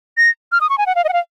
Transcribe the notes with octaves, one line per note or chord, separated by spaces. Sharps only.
A#6
F6
D#6
C#6
G#5
F#5
F5
D#5
F#5
F5